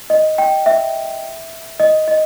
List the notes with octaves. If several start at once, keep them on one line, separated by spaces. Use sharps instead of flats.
D#5
G5
E5
D#5
D#5